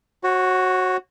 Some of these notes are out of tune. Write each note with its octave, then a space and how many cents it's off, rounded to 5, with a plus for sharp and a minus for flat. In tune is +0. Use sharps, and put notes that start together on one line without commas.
F#4 +0 C#5 -40